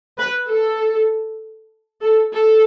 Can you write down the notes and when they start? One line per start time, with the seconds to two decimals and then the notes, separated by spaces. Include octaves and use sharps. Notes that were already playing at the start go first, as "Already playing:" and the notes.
0.18 B4
0.49 A4
2.02 A4
2.31 A4